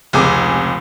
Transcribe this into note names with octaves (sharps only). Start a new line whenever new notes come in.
F1 C#2 C3 G#4 D6 D#6